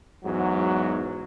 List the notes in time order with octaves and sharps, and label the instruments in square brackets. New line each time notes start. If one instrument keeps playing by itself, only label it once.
[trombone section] E2 G#2 F#3